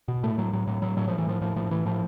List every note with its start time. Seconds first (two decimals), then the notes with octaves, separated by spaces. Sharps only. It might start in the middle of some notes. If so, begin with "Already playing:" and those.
0.08 B2
0.23 A2 A3
0.38 A2 F#3
0.53 A2 F#3
0.67 A2 F#3
0.82 A2 F#3
0.97 A2 F#3
1.08 A2 F3
1.18 E3
1.27 A2 F3
1.42 A2 F3
1.56 A2 F3
1.71 A2 E3
1.86 A2 F3